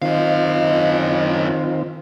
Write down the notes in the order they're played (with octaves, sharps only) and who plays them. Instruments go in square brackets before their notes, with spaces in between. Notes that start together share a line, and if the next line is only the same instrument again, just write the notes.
[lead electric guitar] F#2 F5 [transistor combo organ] D#3 C4 F4 [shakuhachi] D#5